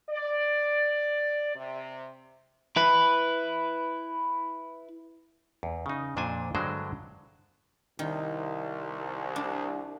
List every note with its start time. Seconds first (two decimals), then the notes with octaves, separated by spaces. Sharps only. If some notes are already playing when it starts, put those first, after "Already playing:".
0.10 D5
1.56 C3
2.76 E4 B4
5.63 E2
5.86 C#3 D#4
6.17 F2 A#2 D4 C5 G#5
6.55 G2 D3 F#3 G#3 D4 C5
7.99 C2 D#3
9.36 D4